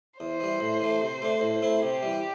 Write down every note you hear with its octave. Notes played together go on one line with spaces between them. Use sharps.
E2 C5
E3 G3
A2
E3 A3
C3
A3 D4
A2
A3 C4 E4
C3 G4
E3 G3